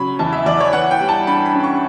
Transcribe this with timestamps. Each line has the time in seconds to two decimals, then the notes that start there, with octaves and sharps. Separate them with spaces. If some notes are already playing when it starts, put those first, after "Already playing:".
Already playing: C#3 F#3 B5 C#6
0.19 E2 A5
0.33 E5
0.46 E2 D5
0.60 C#5
0.73 E3 F#5
0.91 G5
1.01 G3
1.09 A5
1.27 G2 B5
1.46 B5
1.54 C#4
1.63 C#6